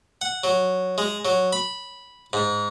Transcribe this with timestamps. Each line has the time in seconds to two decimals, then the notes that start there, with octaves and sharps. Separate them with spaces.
0.21 F#5
0.44 F#3
0.98 G#3
1.25 F#3
1.53 B5
2.33 G#2